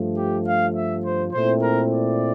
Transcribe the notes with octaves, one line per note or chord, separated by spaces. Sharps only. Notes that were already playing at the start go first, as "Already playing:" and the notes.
Already playing: G2 F3 A3
G4
F5
E5
C5
A#2 A3 C4 E4 C5
A#4
D5